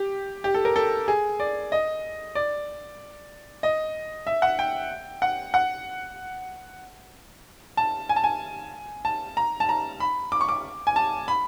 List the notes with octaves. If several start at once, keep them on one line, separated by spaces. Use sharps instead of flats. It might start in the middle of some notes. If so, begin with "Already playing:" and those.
Already playing: G4
G4
A4
A#4
A4
G#4
D5
D#5
D5
D#5
E5
F#5
G5
F#5
F#5
A5
G#5
A5
G#5
A5
A#5
A5
A#5
B5
D6
C#6
D6
G#5
A5
B5